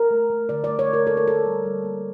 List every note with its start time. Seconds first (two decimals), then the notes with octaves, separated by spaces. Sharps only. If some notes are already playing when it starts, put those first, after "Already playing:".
Already playing: A#4
0.11 A3
0.30 A3
0.49 D3 D5
0.64 A3 D5
0.79 C#5
0.88 A3
0.93 A#4
1.07 A#3 A4
1.17 A#4
1.27 D3 A4
1.46 G3
1.65 G3
1.84 A#3